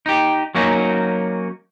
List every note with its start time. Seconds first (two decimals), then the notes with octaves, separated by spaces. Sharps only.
0.06 D#4 G4
0.55 F#3 A#3 C#4 D#4 F#4